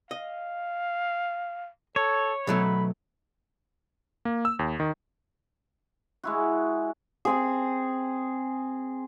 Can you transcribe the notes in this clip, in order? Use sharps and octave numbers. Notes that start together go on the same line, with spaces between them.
D#5 F5
A4 C#5
B2 F#3 A3 B5
A#3
E6
D#2
D#3
G#3 E4 F#4
C4 G#4